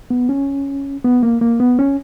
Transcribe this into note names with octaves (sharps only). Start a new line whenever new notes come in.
B3
C#4
B3
A#3
A#3
B3
C#4